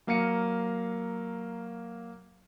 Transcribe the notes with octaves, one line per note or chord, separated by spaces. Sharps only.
F#3 A#3 F5 A#5 C#7 D#7